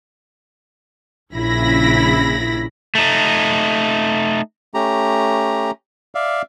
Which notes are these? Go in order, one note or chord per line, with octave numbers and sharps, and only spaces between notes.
A#1 C#3 E4 B5 A#6
A3 D#4
A3 C#4 G4 A#5
D5 E5 F5